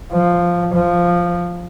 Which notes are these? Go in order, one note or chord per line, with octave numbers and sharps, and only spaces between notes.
F3
F3